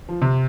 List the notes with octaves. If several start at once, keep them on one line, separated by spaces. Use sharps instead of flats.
F3
C3